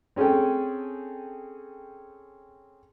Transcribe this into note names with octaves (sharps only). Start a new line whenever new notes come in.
C4 C#4 G#4 A4 G5